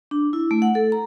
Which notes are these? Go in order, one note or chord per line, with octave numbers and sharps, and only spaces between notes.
D4
E4
A3
F#5
A4
A#5